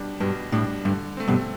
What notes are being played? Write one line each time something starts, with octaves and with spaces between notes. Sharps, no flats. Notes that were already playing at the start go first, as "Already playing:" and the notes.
Already playing: B2 G3 D4
G2 B2
A2 G3 D4
G2 D3
A3 C4
G2 B2